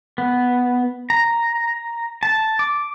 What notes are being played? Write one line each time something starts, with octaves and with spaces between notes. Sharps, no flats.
B3
A#5
A5
D6